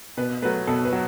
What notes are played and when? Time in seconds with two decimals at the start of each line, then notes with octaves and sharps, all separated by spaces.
0.17 B2 B4
0.42 F#3 A3 B4
0.67 B2 A4
0.85 B4
0.93 F#3